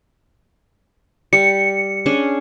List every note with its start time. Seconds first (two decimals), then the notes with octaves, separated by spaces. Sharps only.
1.33 G3 C#7
2.06 C#4 D4 G#4